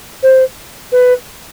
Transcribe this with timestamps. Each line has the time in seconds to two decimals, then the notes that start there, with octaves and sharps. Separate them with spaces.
0.23 C5
0.92 B4